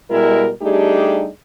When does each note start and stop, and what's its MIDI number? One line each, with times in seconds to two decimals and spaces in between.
0.11 0.49 47
0.11 0.49 55
0.11 0.49 56
0.11 0.49 64
0.11 0.49 70
0.62 1.28 55
0.62 1.28 57
0.62 1.28 62
0.62 1.28 63
0.62 1.28 67
0.62 1.28 68